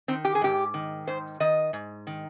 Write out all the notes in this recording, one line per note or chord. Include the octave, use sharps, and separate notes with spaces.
D#3 C4
G4
G#4
G#2 G4
D#3
G#2 C5
D#3 D#5
G#2
D#3